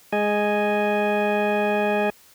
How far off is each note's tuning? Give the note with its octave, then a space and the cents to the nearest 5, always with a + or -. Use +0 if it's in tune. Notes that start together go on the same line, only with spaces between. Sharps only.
G#3 +0 D#5 +0 G#5 +0